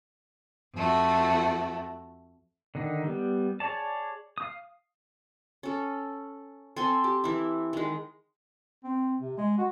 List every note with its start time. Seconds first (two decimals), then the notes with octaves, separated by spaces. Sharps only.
0.75 F2 A3 F#4
2.75 D3 D#3 D#4
3.04 G3 B3
3.60 G#4 C#5 D5 A5
4.38 F5 D#6
5.63 C#4 A4
6.76 C4 A4 G#5 C6
7.04 G4
7.24 E3 E4
7.73 D#3 G#3
8.84 C4
9.20 C3
9.38 G#3
9.58 F#4